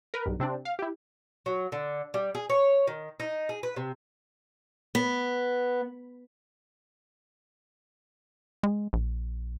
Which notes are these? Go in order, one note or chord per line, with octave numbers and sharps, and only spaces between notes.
A#4 B4
B1 G2
C3 C4 D4
F5
E4 G4
F#3
D3
G3
G#4
C#5
D#3
D#4
G#4
B4
C3
B3
G#3
A#1